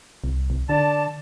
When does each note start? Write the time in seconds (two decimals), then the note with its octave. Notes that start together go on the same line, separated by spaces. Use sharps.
0.24 C2
0.50 C2
0.69 D3 D5 A5